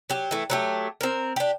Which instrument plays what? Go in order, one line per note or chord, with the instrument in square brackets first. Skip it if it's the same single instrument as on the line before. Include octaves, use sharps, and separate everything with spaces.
[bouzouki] F#3 G4
E3 A3
F#3 A3 G4
C4 A#4
D4 G4